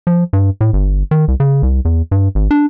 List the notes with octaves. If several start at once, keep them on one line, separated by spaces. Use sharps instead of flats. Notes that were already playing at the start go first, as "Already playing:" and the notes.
F3
G2
A2
G1
D#3
C2
C#3
C2
E2
G2
G#1
D4